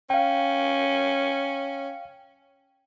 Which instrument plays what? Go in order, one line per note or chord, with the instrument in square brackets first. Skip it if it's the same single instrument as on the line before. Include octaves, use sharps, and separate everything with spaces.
[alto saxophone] C#4 [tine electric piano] F5 G5